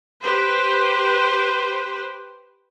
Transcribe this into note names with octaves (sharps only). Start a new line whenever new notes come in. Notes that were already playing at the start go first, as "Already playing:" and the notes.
G4 B4 C5